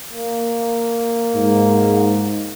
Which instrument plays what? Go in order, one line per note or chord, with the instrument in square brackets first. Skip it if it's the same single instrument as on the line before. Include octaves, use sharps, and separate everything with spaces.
[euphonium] A#3
[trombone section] G#2